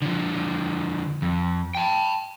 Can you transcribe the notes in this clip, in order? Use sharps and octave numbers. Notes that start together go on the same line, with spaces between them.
D3 F3
F2
G5 A5